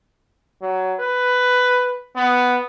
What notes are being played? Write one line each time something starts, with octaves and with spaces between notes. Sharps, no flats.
F#3
B4
B3